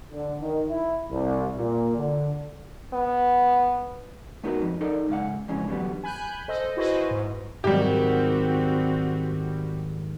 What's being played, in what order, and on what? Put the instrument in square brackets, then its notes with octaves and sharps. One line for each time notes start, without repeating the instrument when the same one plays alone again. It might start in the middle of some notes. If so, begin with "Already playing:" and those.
[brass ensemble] D3
D#3
E4
C2
A#2
D3
[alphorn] B3
[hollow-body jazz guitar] A3 B3 D#4 F#4 A#4 B4
F2
D#4 A4 A#4 D5
G#2 C#3 F5 F#5
F2 G#2 C#3 E3 C#4
D3 E3 F#3 G3 B3
[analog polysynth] G#5 B5 F#6 G6
A4 C5 D#5
E4 F#4 G#4 B4 C5 D#5
G#2
[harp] G#2 D#3 F#3 [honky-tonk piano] G3 G4 [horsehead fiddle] C4 F#4